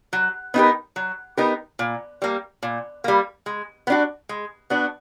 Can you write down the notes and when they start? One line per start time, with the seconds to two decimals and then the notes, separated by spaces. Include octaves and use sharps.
0.13 F#3
0.54 B3 D#4 G4 A#4
0.96 F#3
1.37 B3 D#4 G4 A#4
1.79 A#2
2.22 G3 A#3
2.63 A#2
3.04 G3 A#3
3.46 G#3
3.87 B3
3.90 D4 F#4
4.29 G#3
4.70 B3 D4 F#4